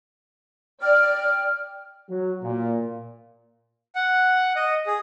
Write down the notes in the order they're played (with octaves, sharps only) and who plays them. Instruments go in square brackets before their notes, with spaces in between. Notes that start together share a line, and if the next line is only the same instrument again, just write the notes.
[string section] D5 [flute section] G5 F6
[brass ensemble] F#3
A#2
[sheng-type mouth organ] F#5
D#5
G#4